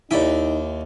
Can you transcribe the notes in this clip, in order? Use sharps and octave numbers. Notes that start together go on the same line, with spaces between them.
D#2 D#4 E4 D5 G5